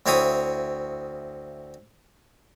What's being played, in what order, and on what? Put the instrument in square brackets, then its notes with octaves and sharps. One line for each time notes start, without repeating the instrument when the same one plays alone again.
[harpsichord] D2 C4 E4 C#5 B5 D#6